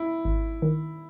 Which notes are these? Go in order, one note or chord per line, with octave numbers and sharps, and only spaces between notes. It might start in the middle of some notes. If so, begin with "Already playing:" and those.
Already playing: E4
G#1
D#3